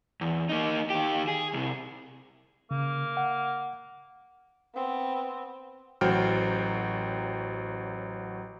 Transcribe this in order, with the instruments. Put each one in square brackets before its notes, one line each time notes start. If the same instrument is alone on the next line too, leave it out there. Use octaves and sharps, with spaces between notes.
[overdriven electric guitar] E2
A#3 D#4
D#3 G4
G#4
C2 C3
[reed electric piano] C#3 [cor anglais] A#3
[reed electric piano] F#5
[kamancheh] B3 C4
[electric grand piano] A1 F#3 F#4 C5 G5 F6